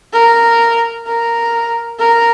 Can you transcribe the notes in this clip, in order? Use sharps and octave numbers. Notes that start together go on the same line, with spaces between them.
A#4
A#4
A#4